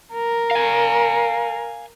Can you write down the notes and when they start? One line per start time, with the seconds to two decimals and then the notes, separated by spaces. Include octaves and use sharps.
0.14 A#4
0.51 F5 G#5